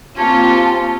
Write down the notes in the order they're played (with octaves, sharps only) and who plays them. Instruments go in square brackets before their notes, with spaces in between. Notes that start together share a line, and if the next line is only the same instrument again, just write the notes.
[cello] A#3 G4 [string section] C4 F4 [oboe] C#4 [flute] A5